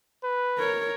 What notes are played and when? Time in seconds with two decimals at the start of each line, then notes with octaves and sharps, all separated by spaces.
0.24 B4
0.58 A#4 C#5